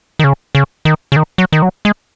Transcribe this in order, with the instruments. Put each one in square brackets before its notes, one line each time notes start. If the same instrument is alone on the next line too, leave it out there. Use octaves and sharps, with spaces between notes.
[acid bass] D#3
C#3
C#3
D#3
C#3
D#3
F#3
D#3
F#3
G#3